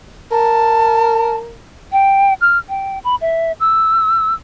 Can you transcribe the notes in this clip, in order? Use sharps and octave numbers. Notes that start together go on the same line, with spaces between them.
A#4 A5
G5
F6
G5
B5
E5
E6